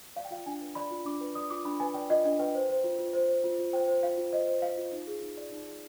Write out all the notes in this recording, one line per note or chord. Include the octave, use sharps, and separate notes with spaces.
D5 F5
G5
F4 F5
D4 G#5
B4
D5 B5
F4
D4 D6
B4
D5 D#6
F4 D6
D4 B5
B4 G#5
D5 G5
F4 D#5
D4 D#5
B4 G5
C5
C5
F4
F4
C5
C5
F4
F4
C5 G5
C5
F4 F5
F4
C5 D#5
C5
F4 F5
F4
D#4
G#4
D#4
D5
D#4
G#4